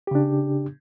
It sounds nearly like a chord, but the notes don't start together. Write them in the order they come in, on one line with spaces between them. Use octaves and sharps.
G4 C#3 D4